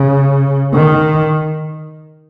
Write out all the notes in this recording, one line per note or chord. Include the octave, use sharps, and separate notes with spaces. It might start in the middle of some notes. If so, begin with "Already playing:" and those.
Already playing: C#3
D#3